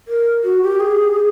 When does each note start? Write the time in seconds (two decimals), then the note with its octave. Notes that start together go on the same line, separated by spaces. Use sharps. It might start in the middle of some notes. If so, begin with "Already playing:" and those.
0.08 A#4
0.44 F#4
0.62 G4
0.80 G#4